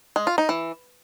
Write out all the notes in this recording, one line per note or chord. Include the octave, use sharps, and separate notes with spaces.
G#3
F4
D#4
E3